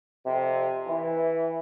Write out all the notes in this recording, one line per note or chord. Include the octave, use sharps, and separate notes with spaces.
F2 C3
E3